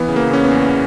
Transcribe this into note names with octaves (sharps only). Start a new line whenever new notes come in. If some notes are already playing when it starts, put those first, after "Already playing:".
Already playing: E3 B3
C#3
A#3
E2 C#4
B3
E2